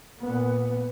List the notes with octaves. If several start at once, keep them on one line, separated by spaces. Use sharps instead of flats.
A#2 B3